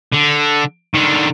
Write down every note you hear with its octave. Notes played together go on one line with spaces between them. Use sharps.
D3
D3 D#3